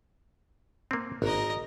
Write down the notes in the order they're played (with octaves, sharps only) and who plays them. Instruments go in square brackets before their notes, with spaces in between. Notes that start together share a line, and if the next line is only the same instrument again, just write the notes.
[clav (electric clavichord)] A#3 C4
[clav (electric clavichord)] G#1 [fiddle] A#4 D#5